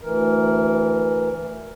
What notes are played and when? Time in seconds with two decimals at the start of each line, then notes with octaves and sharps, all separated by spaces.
0.01 D2 E3 A#4